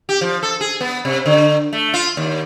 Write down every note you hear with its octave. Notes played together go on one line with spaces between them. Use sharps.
G4
F3
A4
G#4
B3
C3
D3
A3
F4
D#2